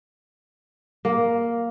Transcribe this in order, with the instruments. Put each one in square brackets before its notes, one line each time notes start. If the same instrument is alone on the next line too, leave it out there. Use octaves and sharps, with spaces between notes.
[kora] A#3